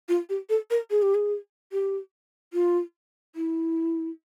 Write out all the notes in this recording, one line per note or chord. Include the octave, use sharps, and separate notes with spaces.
F4
G4
A4
A#4
G#4
G4
G#4
G4
F4
E4